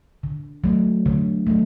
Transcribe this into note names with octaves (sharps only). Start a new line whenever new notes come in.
D3
F#3 A3
D3
F#3 A3